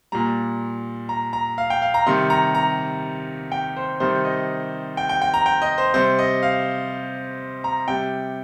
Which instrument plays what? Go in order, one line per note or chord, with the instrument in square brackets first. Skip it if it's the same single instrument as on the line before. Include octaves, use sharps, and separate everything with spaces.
[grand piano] A#2 G3 A#5
A#5
A#5
F5
G5
F5
A#5
C3 D#3 G3 C6
A#5
A#5
G5
C5
C3 D#3 G3 C5
D#5
G5
G5
G5
A#5
G5
D#5
C5
C3 G3 C5
D#5
F5
A#5
C3 G3 G5